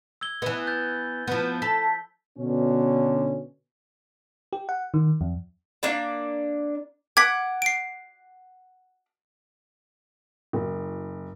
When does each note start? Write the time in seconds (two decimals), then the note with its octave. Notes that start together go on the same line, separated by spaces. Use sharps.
0.21 E6 G#6 G7
0.42 E3 B3
0.67 G6 A6
1.28 F3 B3
1.62 A4 B6
2.39 B2 D3 C#4
4.53 G4
4.69 F#5
4.94 D#3
5.21 F2
5.83 A#3 D4 D5 A#5
7.17 F#5 D6 G#6 B6
7.62 C7 D7
10.53 F#1